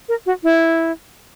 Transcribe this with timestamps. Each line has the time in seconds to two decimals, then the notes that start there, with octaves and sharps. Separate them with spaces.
0.09 A#4
0.26 F#4
0.44 E4